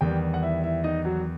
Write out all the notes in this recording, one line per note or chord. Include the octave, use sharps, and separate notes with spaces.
E2 D#3 G3 G4 G5
F#5
E4 E5
E4 E5
D#4 D#5
F#3 F#4